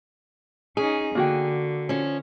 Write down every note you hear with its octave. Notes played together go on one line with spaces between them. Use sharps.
C#4 D#4 G#4
D3 A#3 F#4 G5
F3 C#4